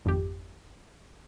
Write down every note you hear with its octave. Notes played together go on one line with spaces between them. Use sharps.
G#1 F2 G4